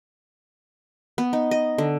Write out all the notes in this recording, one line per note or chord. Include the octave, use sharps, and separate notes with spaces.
B3
D#4
D#5
D3